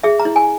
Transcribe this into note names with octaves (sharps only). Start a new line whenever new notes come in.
G#4 E5
A#5
E4
G#5